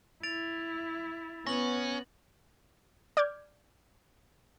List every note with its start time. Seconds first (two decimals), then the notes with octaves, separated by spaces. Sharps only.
0.23 E4 A6 D7 F7
1.47 B3 C#4 A#6 F#7
3.17 D5 D6 F6 G6 G#6